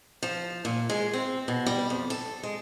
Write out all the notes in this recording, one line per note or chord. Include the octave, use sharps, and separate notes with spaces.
F3
A#2
G#3
C4
B2
G3
F2
A4
G#3